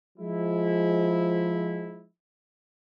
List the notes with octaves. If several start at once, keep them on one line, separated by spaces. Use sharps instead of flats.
F3 G#3 E4